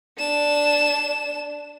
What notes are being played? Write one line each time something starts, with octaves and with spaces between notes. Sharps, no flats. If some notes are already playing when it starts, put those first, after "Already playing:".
D4 E7